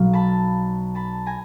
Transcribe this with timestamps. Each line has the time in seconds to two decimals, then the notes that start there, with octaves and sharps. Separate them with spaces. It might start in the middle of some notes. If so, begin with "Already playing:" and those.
Already playing: B1 B2 F#3 F5
0.13 A5 B5
0.95 A5 B5
1.26 G#5 A#5